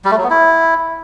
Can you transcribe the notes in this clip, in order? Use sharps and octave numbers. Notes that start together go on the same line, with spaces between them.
G3
A3
F#3
B3
E4